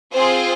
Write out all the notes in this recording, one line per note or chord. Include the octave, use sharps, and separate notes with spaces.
C4 F4 G#4 C5